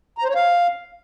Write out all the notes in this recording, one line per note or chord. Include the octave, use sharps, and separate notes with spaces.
A#5
C5
C#5
F5